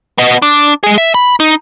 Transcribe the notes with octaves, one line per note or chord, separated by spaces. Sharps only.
B3 D#5
D4
G#3 G#4
E5
B5
D#4